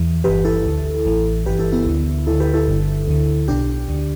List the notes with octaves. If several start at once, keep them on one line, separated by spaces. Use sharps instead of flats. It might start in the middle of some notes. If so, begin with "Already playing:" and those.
Already playing: E2 E3
G1 G2 E3 G4 B4
E4 A4
D2 D3
A1 A2 E3
G1 G2 E3 G4 B4
E4 A4
B3 E4
D2 D3
D2 D3 E4 A4
G4 B4
E4 A4
G1 G2 D3
D2 D3
B1 B2 D4 G4
D2 D3